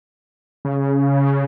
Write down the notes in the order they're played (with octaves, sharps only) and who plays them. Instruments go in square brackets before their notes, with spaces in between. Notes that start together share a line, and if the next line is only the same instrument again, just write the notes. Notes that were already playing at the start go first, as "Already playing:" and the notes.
[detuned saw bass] C#3